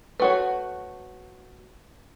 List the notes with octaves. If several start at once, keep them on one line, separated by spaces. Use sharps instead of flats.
A3 F#4 B4 C#5